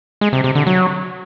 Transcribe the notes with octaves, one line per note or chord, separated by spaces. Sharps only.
G#3
C3
C3
D3
F#3